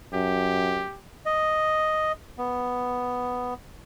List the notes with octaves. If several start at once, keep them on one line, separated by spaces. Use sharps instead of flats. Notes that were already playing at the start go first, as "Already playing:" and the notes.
F#2 G4
D#5
B3